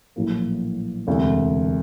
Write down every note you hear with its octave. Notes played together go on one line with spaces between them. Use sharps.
A#1 A2 F#3 A#3
E1 D2 C3